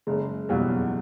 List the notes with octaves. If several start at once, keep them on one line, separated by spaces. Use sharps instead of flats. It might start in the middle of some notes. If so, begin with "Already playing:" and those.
F#1 G#3
E2 B2 F#3 G3